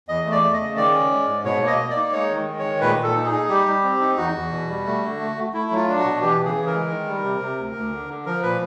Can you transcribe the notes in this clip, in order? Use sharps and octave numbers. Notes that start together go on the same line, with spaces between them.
E2 D#5
A3
D5
A3
D#5
C#3
D#3 D5
C#4
G#3
G#2
B2 C#5
A#3
D#5
A#3
D5
D#4
G#3 C#5
D#3
G#3
C#5
D#3
A#2 B4
A#2
A4
D#4
G#4
D#4
G3 G4
G3
C4
D#4
E2 F#4
E2
B2
G3
A3
D3
A3
A3
A3 E4
F#3
F4
D4
F#4
B2
E3 G4
C#3
G#4
E3
A#4
G#3
D#3
G3
C3
C3
D2
D2
D3
D3
F3 A#4
A#2 B4